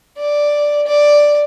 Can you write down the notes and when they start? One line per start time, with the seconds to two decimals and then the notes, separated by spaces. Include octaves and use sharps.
0.18 D5
0.87 D5